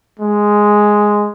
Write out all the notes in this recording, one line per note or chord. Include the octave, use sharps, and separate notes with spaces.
G#3